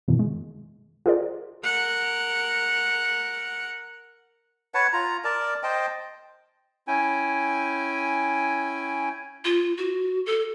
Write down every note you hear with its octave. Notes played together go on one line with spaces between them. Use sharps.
F#2 B2 D#3 E3
G#3
F4 G4 G#4 A#4 C5 D5
A#4 F#5
B4 C#5 F#5 A5
F4 A#5
A#4 D5 A5
C5 D#5 G5 A5
C#4 E4 G5 G#5
F4
F#4
A4